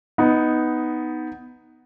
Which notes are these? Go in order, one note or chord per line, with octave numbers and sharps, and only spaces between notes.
B3 D#4